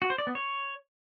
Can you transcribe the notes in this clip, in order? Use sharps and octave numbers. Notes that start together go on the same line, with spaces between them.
F#4
C5
D5
B3
C#5